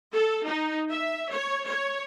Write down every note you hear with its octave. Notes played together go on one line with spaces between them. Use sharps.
A4
D#4
E5
C#5
C#5